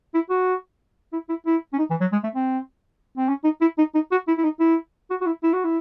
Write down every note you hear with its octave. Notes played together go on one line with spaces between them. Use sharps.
E4
F#4
E4
E4
E4
C#4
D#4
E3
F#3
G#3
A3
C4
C4
C#4
D#4
E4
D#4
D#4
F#4
E4
E4
D#4
E4
F#4
F#4
E4
E4
F#4
E4